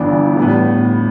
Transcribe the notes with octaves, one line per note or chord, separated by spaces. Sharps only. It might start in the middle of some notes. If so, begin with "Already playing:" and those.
Already playing: G1 G2 E3 B3 D4
A2 G3 B3